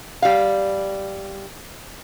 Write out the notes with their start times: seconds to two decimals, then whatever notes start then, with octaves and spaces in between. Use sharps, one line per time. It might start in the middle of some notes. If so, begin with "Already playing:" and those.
0.22 G3 F5